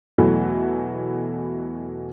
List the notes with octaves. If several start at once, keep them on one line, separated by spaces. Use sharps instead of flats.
E2 B2 E3 F#3 A3 B3